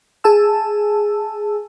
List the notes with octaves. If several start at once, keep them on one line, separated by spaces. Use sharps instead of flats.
G#4 G#5 A5 E6